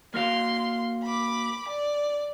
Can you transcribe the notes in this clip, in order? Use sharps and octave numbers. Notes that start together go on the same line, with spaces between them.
A#3 F#4 F5 C6
B5 D6
D5